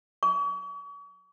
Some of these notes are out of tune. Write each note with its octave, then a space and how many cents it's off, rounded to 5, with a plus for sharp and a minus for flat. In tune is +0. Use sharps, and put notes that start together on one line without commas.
C#6 +40